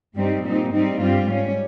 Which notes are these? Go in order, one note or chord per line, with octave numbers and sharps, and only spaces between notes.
G2 G3 C4 D#4
A#2 G3 C4 D#4
G#2 G3 C4 D#4
G2 G3 C4 F4
G#2 G3 C#4